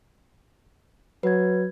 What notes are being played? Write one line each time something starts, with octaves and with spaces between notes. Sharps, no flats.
F#3 B4 G#6